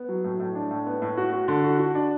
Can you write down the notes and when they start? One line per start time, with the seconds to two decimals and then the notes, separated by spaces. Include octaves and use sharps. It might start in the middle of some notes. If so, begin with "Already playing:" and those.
Already playing: B3
0.09 F#3
0.24 A2
0.40 A2
0.55 D4
0.71 A2
0.86 B3
1.02 A2
1.17 F#4
1.33 F#4
1.48 D3
1.64 F#4
1.79 F#4
1.95 D4